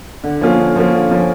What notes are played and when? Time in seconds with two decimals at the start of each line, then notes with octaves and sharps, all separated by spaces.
0.24 D3
0.41 F3 A#3 C#4 F4
0.59 D3
0.76 F3 A#3 C#4 F4
0.93 D3
1.11 F3 A#3 C#4 F4